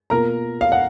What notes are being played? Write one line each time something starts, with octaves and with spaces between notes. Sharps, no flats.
B2 A#3 F4 A#4 A#5
F5
F#5